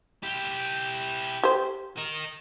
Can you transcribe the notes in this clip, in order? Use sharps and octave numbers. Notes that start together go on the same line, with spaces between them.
E4 G4
G4 C5
A#4 D#5